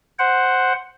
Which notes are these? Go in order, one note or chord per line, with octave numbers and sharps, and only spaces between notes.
C5 F#5